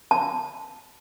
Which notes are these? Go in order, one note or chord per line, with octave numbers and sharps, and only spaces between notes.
A5